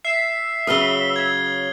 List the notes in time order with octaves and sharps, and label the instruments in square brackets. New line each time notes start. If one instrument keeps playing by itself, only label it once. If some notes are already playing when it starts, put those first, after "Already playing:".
[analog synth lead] E5 [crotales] C7
[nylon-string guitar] C#3 F#3 B4 [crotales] D#6 F6 G7
[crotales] G#6